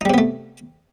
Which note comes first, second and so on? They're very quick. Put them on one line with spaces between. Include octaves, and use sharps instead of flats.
D#4 G3 C3 B3 A3